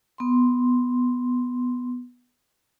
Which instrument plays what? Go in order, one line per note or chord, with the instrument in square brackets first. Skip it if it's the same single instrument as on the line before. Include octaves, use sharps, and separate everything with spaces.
[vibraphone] B3 C6